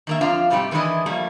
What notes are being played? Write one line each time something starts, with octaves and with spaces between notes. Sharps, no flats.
D#3 A#3 E5
F2 F3 D4 F4 F5 A#5
G#2 C3 G3 A3 G4
D#3 E3 G#3 D4 E4 D#5
F3 G3 A3 A#3